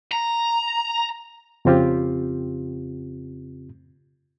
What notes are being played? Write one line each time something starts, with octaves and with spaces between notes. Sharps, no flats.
A#5
F2 C#3 C4 F4 G4